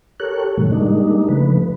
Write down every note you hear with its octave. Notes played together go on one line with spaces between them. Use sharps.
G4 A4 A#4 C#5 F#6
A2 C3 D#3 F#3 A3
G3 G#3 A#3 D4 D#4
C#3 F3 A3 B4